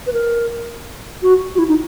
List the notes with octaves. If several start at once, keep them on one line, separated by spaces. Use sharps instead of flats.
B4
A#4
F#4
F#4
E4
D#4